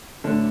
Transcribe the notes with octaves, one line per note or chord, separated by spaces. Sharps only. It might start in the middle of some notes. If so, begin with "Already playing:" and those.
A2 D3 F#3 A3 D4